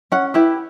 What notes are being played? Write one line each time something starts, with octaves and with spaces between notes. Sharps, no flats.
C#4 F#5
E4 G4 B4